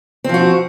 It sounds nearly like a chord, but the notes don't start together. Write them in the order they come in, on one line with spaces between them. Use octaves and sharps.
C4 F3 F#4